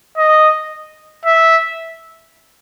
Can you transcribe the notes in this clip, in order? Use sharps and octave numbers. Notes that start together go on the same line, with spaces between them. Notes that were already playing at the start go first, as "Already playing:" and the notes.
D#5
E5